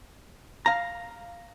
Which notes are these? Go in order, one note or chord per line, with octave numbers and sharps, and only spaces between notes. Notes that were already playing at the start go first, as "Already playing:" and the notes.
F5 A#5